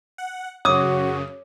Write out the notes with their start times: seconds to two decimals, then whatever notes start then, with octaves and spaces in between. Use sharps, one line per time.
0.18 F#5
0.65 F#2 C#3 F#4 C#5 D6 D#6